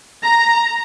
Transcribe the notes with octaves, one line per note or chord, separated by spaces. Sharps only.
A#5